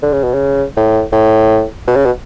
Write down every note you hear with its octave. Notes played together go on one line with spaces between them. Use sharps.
D3
C#3
B2
C#3
A2
A2
B2
C#3
B2